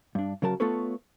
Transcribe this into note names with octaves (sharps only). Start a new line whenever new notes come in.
G2 D4
C#3 F#3 A#4 A5
A3 B3 F4 A4 B4 C#5